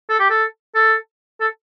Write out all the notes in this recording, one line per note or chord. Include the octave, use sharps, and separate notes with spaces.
A4
G4
A4
A4
A4